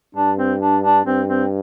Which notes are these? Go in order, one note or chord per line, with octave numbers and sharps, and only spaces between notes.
G2 D4
C4
D4
D4
G2 C4
C4